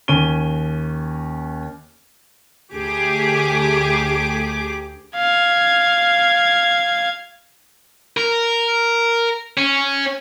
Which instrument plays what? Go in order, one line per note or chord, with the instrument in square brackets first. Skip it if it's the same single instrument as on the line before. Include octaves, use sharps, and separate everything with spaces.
[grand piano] D#2 C#4 D#7 G7
[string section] D2 G4 G#4 D6
[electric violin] F5 G#6
[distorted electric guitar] A#4
C#4